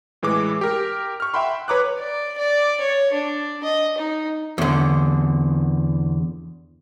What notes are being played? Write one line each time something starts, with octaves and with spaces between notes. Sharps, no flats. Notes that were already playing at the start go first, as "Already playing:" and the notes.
A2 E3 G#3 D6
G4 A#4
C#6 F6
E5 F#5 G5 B5 C6
B4 C#5 A#5 D6 D#6 F#6
D5
D5
C#5
D4
D#5
D#4
E2 D3